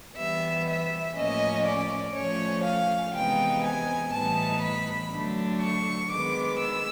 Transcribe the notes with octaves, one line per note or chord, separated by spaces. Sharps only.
E3 G3 B3 E5
E5
A2 F3 A#3 C#4 D#5
D5
F3 A3 C#4 C#5
F5
C3 E3 G#3 B3 D#4 G5
G#5
A2 E3 G3 B3 D#4 A5
B5
D3 F#3 A3 D4
C#6
D#3 G#3 B3 D6
E6